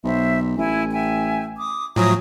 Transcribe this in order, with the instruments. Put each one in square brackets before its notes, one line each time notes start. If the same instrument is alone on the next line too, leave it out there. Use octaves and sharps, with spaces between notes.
[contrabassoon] B1 [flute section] C5 E5
[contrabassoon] A1 [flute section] E4 G#5
[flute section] E5 G5 G#5
D6 D#6
[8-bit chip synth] A2 F#3 [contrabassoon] F3 [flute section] G#5 A#5 D#6